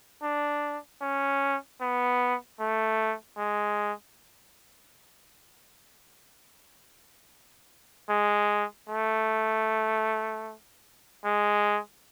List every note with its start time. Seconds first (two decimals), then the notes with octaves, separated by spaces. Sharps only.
0.23 D4
1.02 C#4
1.81 B3
2.60 A3
3.37 G#3
8.10 G#3
8.89 A3
11.25 G#3